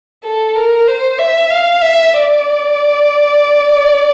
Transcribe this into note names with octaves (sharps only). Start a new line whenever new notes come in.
A4
A#4
C5
E5
F5
E5
D5